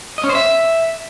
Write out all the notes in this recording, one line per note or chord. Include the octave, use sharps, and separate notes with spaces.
D#5
C#4
C5
E5